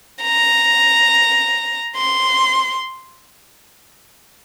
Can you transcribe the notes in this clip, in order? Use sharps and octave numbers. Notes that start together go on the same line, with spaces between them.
A#5
C6